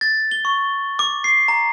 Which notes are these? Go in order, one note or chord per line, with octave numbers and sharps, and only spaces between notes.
A6
G7
C#6
D6
C7
A#5